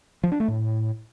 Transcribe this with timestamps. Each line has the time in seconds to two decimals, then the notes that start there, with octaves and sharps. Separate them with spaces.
0.23 F3
0.32 D4
0.40 A3
0.48 A2